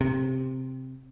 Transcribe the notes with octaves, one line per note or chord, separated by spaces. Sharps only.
C3